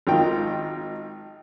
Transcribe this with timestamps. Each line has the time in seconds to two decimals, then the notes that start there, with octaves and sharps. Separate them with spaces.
0.07 G#1 D#3 F4 G5